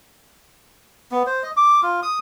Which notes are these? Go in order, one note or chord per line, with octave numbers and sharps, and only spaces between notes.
B3
C5
D#5
D6
F4
D#6